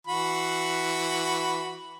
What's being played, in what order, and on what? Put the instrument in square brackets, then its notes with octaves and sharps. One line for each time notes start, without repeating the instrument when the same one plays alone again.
[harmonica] E3 F#4 B5